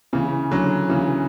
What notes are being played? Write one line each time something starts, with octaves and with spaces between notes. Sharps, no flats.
C#3 E3
D3 F#3
C#3 E3